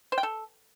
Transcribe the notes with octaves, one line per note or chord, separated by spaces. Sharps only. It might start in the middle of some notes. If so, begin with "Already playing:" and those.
C5
G5
A4